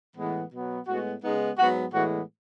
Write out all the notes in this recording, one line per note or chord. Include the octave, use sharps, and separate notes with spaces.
A2 E3 G#3 B3
B2 F#3 B3
A2 G#3 B3 F#4
C#3 G#3 B3 D#4
G#2 F#3 B3 F#4
A2 E3 G#3 B3 F#4